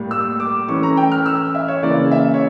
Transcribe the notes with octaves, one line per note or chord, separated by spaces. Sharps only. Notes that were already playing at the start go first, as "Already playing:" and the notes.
Already playing: A2 G3 A#3
E6
D6
E3 A3 C#4 C#6
A#5
G5
F6
E6
E5
C#5
C#3 E3 A#3 D5
E5
C#5